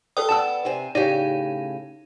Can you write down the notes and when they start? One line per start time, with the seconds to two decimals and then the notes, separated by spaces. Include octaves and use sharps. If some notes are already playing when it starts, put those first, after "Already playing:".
0.17 A4 B4 D5 G5 D#6
0.29 B3 D5 A5 E6 E7
0.65 C3 C4 G#5
0.95 A2 C#3 D#4 G4 D5